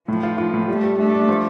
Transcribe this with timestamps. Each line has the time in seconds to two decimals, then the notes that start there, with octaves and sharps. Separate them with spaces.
0.08 A2 F3
0.23 F4
0.38 F4
0.54 A2
0.68 G3 A3
0.84 G3
0.99 A3 D4
1.14 D4
1.29 F3